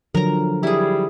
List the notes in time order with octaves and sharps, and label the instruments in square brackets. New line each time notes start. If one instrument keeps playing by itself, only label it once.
[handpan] D3 F3 F#3 [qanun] A#4 A#5
[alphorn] G3 [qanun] E4 G#4